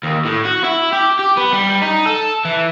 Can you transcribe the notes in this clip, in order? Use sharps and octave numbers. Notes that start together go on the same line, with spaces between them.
D#2
A2
F#4
E4
G4
G4
B3
G3
D#4
A4
E3